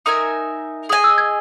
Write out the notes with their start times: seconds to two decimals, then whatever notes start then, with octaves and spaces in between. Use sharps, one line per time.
0.06 D#4 A#4 E5 G#5 D#6
0.89 G#4 D#5 G#5 D#6
1.04 E6
1.18 G#6